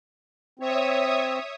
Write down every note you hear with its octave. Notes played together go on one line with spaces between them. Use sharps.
C4 C#5 E5 D#6